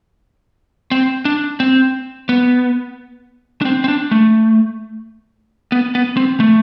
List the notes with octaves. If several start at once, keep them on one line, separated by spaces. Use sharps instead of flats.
C4
D4
C4
B3
D4
C4
C4
D4
A3
B3
B3
C4
A3